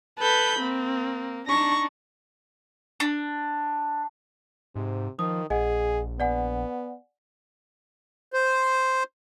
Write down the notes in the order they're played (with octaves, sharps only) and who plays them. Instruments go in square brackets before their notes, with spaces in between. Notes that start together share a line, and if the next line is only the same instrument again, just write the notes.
[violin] A4 G6 [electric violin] B4 B5
[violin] A#3 [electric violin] C4
[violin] D4 D#4 [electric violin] C#6 A#6
[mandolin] D4
[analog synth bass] G#2 [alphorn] C3
[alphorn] D#3 [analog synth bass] F3 [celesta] D#6
[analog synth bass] A#1 [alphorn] G#4 [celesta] D#5 F#5 G#5
[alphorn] B3 [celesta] D5 F#5 G#5
[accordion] C5